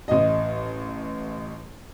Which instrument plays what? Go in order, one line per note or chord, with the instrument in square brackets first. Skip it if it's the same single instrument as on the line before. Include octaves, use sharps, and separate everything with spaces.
[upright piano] A1 D#5